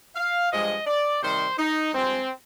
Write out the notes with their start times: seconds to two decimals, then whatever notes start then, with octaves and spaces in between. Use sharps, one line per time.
0.16 F5
0.52 G2 F3 G#3 D#5
0.87 D5
1.22 C3 D#3 G3 C5
1.59 D#4
1.94 G2 F3 G#3 C4